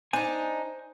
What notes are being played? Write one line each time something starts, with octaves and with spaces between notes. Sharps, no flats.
D4 D#4 C5 G#5